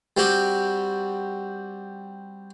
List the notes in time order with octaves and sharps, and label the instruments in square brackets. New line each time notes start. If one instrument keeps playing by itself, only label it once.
[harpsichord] G3 C4 F#4 G4